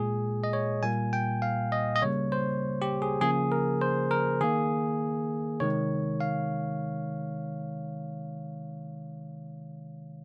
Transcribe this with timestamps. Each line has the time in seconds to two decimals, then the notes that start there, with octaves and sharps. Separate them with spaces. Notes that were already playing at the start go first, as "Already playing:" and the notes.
Already playing: A#2 G#3 G#4
0.44 D#5
0.53 C#5
0.83 A#2 G3 A#3 G#5
1.13 G5
1.42 F5
1.72 D#5
1.96 D#5
2.02 C#3 G3 A#3 C#5
2.32 C5
2.82 G4
3.02 G#4
3.21 C#3 F3 A#3 G#4
3.52 A#4
3.81 C5
4.11 A#4
4.41 D#3 A#3 G#4
5.60 C3 D#3 G#3 C#5
6.21 F5